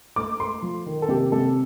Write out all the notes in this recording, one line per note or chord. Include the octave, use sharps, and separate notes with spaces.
A3 D6
A3 C6
F3
D#3
A4
C3 G4
C3 A4